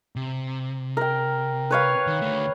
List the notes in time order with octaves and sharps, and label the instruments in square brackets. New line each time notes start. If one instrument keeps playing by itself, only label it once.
[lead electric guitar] C3
[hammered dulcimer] A#4 G5
B4 C#5 F5
[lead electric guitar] D#3
D3 A3